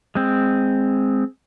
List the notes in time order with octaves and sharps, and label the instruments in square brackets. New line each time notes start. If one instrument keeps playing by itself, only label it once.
[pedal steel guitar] G#3 C4